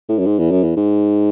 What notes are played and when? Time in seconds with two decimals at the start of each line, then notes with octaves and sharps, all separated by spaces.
0.09 A2
0.18 F#2
0.26 G#2
0.39 E2
0.51 F#2
0.64 E2
0.76 G#2